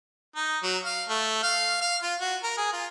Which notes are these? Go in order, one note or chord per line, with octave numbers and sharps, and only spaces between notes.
D#4
F#3
F5
A3
F5
F5
F4
F#4
A#4
G#4
F4